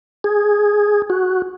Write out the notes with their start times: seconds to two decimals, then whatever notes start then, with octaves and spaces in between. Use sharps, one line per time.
0.24 G#4
1.10 F#4